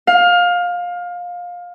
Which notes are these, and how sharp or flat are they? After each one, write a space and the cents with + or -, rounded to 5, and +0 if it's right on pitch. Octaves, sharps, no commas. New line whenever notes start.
F5 +20